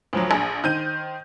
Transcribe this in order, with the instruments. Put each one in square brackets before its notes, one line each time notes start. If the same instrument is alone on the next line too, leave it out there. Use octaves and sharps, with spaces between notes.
[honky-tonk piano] D2 F3 F#3
A#1 G#4
D#3 C5 G6 D#7